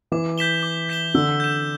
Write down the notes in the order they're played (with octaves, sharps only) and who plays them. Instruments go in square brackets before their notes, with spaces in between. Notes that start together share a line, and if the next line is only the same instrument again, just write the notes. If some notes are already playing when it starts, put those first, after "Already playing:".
[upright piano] E3 [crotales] D6
[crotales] G6 B6 E7 G7
D6
G6 B6 E7 G7
[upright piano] D3 [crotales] E6
[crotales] G6 E7